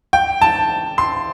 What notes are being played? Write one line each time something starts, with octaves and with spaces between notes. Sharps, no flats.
G5
A5
C6